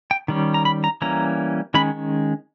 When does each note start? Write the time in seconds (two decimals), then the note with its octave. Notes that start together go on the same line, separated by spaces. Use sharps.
0.11 G5
0.28 D#3 G3 C#4
0.54 A#5
0.65 B5
0.84 A#5
1.02 E3 G3 A#3 C#4 A#5
1.74 D#3 G#3 C#4 B5